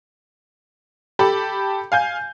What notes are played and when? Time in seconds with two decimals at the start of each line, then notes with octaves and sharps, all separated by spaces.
1.19 G4 A4 A5 B5
1.92 F5 G#5 G6